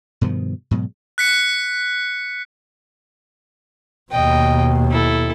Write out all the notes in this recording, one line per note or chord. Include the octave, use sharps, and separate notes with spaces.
G2 B2 D#3 F3
G#2 B2 F#3
F#6 B6 C#7
D#2 B2 D#5 G5
E4 A4